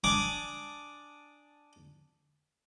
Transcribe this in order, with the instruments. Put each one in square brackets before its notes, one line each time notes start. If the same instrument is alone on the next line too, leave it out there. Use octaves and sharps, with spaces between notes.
[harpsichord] D4 G#5 A5 D6 D#6